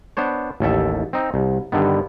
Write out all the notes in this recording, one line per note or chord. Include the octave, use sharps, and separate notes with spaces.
B3 D4 C5 C#5
A1 D#2 A4 E5
C4 D#4
C2
G2 D3 D#3 B3